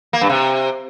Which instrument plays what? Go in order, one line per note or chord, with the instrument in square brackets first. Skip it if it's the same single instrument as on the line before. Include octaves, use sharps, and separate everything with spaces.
[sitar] A#3
G2
C3